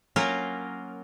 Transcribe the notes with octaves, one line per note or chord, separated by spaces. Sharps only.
F#3 A#3 C#4 F4 A#4